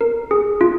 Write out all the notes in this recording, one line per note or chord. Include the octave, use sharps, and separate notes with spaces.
A#4
G#4
F4